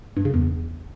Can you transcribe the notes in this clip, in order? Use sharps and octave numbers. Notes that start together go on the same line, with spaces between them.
G2
C#3
E2